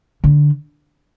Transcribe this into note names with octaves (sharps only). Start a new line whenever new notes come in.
D3